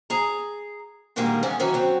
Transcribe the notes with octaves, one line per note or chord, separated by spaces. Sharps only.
G#4 A#5
A#2 D3 D#3 G3 G#3 A#3
E2 B3 C#4
D#3 E3 F#3 C#4 E4
F#3 C4